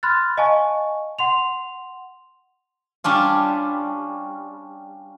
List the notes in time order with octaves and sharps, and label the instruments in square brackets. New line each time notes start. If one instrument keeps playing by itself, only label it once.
[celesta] B5 C6 F6 F#6 A6
D#5 F5 G#5 A5 C#6
F#5 C6 F7
[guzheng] G3 C#4 D4 F4